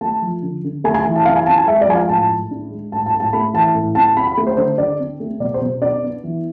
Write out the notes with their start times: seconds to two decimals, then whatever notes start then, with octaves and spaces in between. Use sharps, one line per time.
0.01 A3 A5
0.22 F3
0.42 D3
0.64 D3
0.84 A3 G#5
0.94 G#5
1.05 E3
1.16 A5
1.25 C3 F5
1.36 G#5
1.46 C4 A5
1.58 G#5
1.67 G#3 E5
1.81 D5
1.88 F3 G#5
1.95 F5
2.09 A2 A5
2.29 A2
2.51 D4
2.70 G#3
2.92 A2 A5
3.06 A5
3.13 A2
3.20 A5
3.33 A3 B5
3.53 E3 A5
3.75 A2
3.95 C4 A5
4.16 C4 B5
4.27 B5
4.37 A3
4.47 C5
4.57 D3 C5
4.78 D3 D5
5.00 C4
5.20 A3
5.40 B2 D5
5.54 C5
5.61 B2
5.82 D4 D5
6.03 B3
6.24 E3